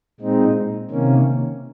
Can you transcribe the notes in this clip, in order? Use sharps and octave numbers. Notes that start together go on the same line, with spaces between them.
A#2 G#3 C4 D#4
C3 D#3 A#3 C#4